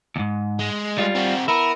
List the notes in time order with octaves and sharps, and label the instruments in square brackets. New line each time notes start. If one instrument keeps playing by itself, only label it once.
[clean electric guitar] D#2 G#2
[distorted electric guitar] G#3
[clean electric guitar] G3 F4
[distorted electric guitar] C4 F#4
[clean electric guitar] B3 E4 [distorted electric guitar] A#4